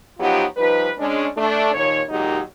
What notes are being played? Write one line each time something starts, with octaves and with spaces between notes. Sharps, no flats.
F3 F#3 B3 D#4 F4 G4
F3 G3 D#4 B4
G#3 C#4 D4
A3 D4
D#2 A#2 D#3 C#5
D#2 A#2 F#3 G#3 D#4 G4